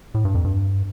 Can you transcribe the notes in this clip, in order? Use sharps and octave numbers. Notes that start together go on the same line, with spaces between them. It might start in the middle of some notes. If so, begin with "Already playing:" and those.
A2
G2
F2
G2